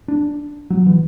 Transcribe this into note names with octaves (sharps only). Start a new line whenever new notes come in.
D4
F#3
E3